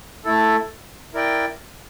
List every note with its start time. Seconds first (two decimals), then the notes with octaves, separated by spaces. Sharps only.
0.25 A3 E4 A4
1.14 E4 A#4 D5 G5